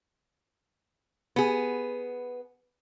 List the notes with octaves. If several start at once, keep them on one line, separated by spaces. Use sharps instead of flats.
B3 G#4